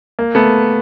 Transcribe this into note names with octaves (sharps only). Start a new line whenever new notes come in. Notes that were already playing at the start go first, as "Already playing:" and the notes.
A#3
A3 B3